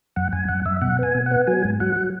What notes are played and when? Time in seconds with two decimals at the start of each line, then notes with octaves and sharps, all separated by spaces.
0.16 F#2 F#5
0.33 F#2 G#5
0.48 F#2 F#5
0.66 F#2 E5
0.82 B2 F#5
0.99 B3 G#5
1.15 B2
1.26 F#5
1.31 B3
1.47 F#3 G#5
1.64 G#2
1.80 F#3 F#5
1.96 F#3